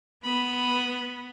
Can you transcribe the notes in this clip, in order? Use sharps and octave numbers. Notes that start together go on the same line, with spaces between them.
B3 B5 D#6